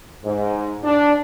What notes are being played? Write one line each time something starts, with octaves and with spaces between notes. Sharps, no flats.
G#2
D4